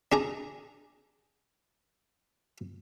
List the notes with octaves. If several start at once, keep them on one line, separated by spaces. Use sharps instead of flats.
D4 G#4 A#5